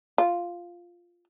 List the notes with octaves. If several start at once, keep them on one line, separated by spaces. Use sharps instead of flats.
F4